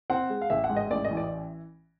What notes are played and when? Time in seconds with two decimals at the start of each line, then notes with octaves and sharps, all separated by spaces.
0.10 C4 F#5
0.29 G#3
0.41 F5
0.50 A1 E5
0.64 F#5
0.70 G#2
0.76 D#5
0.90 A1 D5
1.04 D#5
1.11 E3
1.17 D5